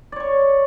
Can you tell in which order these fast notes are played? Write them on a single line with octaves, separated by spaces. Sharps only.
D5 C#5 C#6